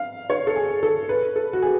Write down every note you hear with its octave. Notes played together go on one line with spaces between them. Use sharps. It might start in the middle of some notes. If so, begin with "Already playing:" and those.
Already playing: F5
C#5
A4
G#4
A4
B4
A4
F#4
G#4